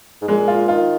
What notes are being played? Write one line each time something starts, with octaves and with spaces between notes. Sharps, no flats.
G#2
A#2 G#3
F4
D#3 F4